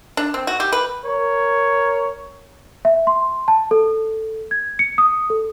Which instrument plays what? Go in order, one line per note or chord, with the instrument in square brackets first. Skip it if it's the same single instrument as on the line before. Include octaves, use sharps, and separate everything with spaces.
[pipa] D4
C4
F#4
G4
B4
[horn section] A#4 C#5
[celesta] E5
C6
A5
A4
G#6
C#7
D#6
A4